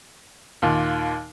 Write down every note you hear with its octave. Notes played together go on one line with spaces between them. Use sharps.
D#2 A#2